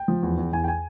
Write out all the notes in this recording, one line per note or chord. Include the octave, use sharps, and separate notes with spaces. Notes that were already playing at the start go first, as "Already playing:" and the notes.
Already playing: G5
F3
E2
E2
E2 G#5
G5
G#5